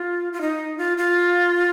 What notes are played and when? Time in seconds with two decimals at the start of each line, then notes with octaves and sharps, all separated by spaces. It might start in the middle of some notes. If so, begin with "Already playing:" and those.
Already playing: F4
0.33 F4
0.41 D#4
0.78 F4
0.97 F4